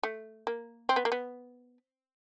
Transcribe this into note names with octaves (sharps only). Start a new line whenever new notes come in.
A3
A#3
C4
B3
A#3
B3